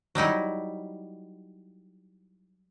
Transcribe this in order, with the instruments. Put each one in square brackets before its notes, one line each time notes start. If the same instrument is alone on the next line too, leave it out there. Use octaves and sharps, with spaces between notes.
[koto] F#3 G3 D#4 E4